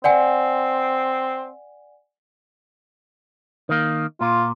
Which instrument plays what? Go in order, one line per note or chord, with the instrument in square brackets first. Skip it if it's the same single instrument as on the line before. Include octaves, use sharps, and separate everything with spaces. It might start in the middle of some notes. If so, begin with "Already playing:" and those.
[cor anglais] C4 [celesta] D5 F#5 G#5
[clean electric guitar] D#3 A#3
[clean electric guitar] A#2 [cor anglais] F4